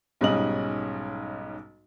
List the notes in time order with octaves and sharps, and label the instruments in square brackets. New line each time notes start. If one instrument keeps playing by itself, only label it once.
[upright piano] B1 G#2 G3 C#4 D#5 F#7